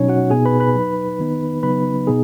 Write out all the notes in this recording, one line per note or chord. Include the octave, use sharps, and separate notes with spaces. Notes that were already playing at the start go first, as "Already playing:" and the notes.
Already playing: B2 F#3 C#4 D#4 C#5
F#4 F#5
B2 B3 D#4 G#4 G#5
B4 B5
B4 B5
F#3 D#4
D#3 B3 D#4
C#3 F#3 B3 D#4 B4 B5
B2 B3 D#4 G#4